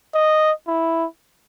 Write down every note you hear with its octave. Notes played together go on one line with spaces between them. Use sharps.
D#5
E4